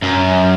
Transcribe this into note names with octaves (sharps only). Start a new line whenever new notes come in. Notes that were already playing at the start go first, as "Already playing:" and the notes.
F#2